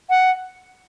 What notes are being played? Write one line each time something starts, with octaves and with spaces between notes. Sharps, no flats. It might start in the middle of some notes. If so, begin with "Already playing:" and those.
F#5